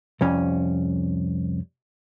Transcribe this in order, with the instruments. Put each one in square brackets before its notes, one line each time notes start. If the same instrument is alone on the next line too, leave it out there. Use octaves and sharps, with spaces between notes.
[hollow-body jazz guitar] C2 F2 C#4